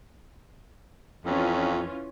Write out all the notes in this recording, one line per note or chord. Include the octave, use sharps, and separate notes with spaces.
F2 E3 C#4 F4